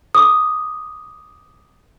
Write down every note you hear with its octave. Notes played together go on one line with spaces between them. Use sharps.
D6 D#6